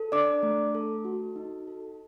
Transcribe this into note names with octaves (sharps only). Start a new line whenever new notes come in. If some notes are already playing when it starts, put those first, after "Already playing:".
Already playing: A4
D4 D5 D6
A3
A4
F#4
D#4
A4